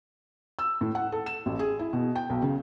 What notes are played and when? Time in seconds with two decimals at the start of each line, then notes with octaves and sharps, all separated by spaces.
0.59 E6
0.81 A2
0.95 F#5
1.12 A4
1.26 E7
1.46 A1
1.59 G#4
1.79 E4
1.93 B2
2.15 G5
2.30 B1
2.42 C#3